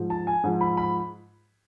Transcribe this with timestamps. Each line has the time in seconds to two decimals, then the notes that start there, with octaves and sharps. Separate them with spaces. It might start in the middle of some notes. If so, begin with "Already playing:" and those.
Already playing: G#2 F3
0.10 A5
0.27 G#5
0.44 G#2 F3
0.61 B5
0.77 B5